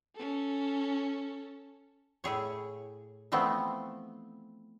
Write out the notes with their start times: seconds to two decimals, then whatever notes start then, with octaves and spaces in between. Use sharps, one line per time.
0.15 C#4 A4
2.24 A2 E4 G#4 C#5
3.32 E3 F3 A3 B3 C4